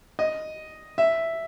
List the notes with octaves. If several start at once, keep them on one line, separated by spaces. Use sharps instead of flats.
D#5
E5